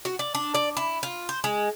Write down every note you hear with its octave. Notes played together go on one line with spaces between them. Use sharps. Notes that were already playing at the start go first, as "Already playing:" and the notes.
F#4
D5
D4
D5
E4
F4
C5
G#3